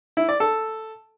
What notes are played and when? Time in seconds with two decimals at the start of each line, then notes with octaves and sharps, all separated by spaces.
0.17 E4
0.29 D5
0.40 A4